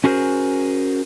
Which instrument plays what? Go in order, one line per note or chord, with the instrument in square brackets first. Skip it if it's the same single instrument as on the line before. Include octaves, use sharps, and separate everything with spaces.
[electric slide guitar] C#4 F#4 G#4 A#4 C5